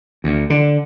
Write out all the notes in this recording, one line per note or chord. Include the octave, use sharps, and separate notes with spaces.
D2
D3